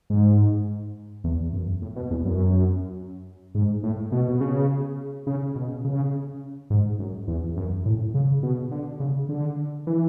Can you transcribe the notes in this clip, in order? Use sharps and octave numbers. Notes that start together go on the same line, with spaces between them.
G#2
E2
F#2
A2
B2
E2
F#2
G#2
A2
B2
B2
C#3
C#3
B2
C#3
G#2
F#2
E2
F#2
A2
C#3
B2
D3
C#3
D3
E3